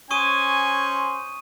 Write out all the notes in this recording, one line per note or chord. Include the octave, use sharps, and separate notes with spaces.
C#4 C5 G#5 C#6 D#6 D#7